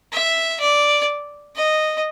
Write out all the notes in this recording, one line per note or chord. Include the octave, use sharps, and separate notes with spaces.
E5
D5
D#5